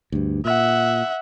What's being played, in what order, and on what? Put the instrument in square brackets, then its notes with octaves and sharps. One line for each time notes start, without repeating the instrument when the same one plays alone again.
[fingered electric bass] D2 G2
[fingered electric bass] A#2 [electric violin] E5 F#5